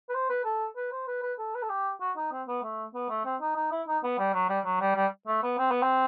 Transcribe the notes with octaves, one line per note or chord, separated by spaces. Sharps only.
B4
C5
B4
A4
B4
C5
B4
B4
A4
B4
A4
G4
F#4
D#4
C4
B3
A3
B3
A3
C4
D#4
D#4
E4
D#4
B3
G3
F#3
G3
F#3
G3
G3
A3
B3
C4
B3
C4